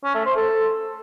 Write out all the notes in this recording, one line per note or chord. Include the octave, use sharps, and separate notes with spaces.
C#4
A3
C5
A4